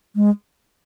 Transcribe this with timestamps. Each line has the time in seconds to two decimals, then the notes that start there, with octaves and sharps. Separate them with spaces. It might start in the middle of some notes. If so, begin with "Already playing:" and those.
0.16 G#3